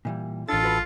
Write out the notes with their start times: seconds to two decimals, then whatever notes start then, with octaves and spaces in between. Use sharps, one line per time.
0.05 A#2 E3 G3
0.49 A1 D4 F4 A4 A6
0.63 F#4 B4 B5